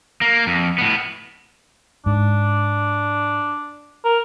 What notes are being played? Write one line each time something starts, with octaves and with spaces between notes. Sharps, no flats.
A#3
F2
A2 B3
G#2 D4
A#4